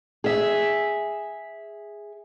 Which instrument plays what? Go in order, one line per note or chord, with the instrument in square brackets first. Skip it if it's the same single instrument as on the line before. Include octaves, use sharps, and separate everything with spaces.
[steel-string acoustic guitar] G#4 E5